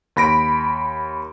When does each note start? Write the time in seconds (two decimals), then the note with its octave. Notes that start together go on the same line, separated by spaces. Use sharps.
0.16 D#2 B5 A#6 D7